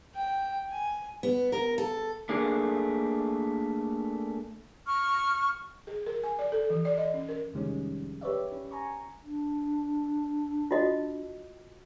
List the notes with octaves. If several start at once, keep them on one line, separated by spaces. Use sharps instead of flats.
G5
G#5
B3
A#4
A4
A3 A#3 D4 G#4
C#6 F6
G#4
A#4
G#5
D5
A4
E3
D5
D#5
C#4
A#4
F2 C3 D#3 G3 G#3 C#4
G4 B4 C#5 D5 E5
C#4
G#5 A#5 C#6
D4
F4 F#4 D#5